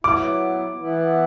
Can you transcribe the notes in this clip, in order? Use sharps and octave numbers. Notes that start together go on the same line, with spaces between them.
F#3 B3 E4 D6
E3 B3 E4